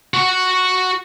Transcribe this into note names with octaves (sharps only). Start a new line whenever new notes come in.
F#4 F#5